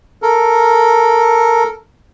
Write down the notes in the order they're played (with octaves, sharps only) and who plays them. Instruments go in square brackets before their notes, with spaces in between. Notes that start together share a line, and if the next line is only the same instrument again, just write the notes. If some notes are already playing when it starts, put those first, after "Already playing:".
[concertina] A4 A#4